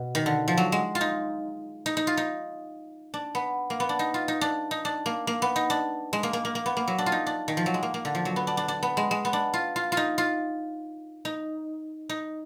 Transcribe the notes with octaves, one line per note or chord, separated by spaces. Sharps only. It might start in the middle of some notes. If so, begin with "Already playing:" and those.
Already playing: B2
D#3
D3
F3
F#3
G#3
F4
D#4
D#4
D#4
F4
D#4
D4
B3
A#3
B3
D4
D#4
F4
D#4
D4
D#4
D4
A#3
A#3
B3
D#4
D4
G#3
A#3
A#3
A#3
A#3
B3
A#3
F#3
D4
F4
D#4
D4
D#3
F3
F#3
G#3
A#3
A#3
D3
F3
F#3
B3
D4
D4
D4
B3
G#3
G#3
B3
D4
F4
F4
F4
D#4
F4
D#4
D#4